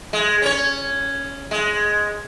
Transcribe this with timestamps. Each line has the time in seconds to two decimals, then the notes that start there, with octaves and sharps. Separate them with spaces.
0.13 G#3
0.42 C#4 C#5
1.51 G#3